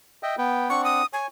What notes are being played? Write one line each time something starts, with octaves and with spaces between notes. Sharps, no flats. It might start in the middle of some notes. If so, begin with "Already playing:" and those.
D#5 E5 G5
B3 B4 G5
C4 D4 F#5 C#6
D#6
C#5 G#5